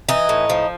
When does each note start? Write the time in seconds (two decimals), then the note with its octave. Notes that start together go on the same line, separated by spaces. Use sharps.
0.09 E3 D#4
0.29 A2
0.50 F3